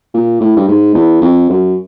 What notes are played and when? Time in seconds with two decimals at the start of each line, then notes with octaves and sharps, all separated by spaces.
0.14 A#2
0.41 A2
0.57 G2
0.68 G#2
0.95 E2
1.22 F2
1.50 F#2